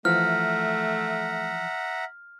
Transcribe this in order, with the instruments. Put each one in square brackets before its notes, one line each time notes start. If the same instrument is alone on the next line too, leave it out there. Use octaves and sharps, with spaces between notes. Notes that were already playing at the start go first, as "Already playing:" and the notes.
[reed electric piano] E3 F3 [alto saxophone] A3 [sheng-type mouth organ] E5 F#5 A#5 [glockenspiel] F6